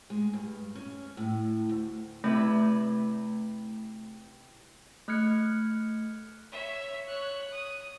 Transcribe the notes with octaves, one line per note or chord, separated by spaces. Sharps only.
G#3
G2
C#4
A2
D2
C3 A3 E4 B4
A3 F6 F#6 G#6 C#7
C#5 E5
C#5 F#6
D#6